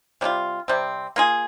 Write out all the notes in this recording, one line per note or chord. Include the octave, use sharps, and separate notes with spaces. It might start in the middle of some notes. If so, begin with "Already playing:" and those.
C3 G3 D4 F4
C3 G3 C4
A#3 F4 G#4